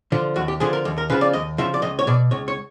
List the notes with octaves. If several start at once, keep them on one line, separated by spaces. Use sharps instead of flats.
D3 F3
D#2 F#4
G4
D3 F3 G#4
A#4
D#2
A#4
C#3 F3 B4
D5
D#2 D#5
C#3 F3 E5
D5
C#2 D#5
C#5
B2 D5
C#2 C#5
C#5